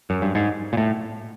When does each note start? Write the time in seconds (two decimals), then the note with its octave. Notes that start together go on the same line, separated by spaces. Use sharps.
0.10 F#2
0.22 G2
0.35 G#2
0.73 A#2
0.77 A2